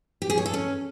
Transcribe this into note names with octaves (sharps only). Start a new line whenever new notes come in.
G4
G#4
C#5
A4
C#4